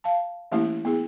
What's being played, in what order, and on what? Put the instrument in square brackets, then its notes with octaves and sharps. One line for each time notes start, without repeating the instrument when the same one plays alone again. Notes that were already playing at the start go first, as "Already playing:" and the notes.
[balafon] F5 A5
E3 A3 A#3 C#4 E4 G4
B3 E4 G#4